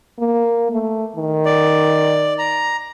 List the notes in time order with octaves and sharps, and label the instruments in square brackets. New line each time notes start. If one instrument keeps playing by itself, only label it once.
[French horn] A#3
A3
D#3
[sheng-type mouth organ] D5
A#5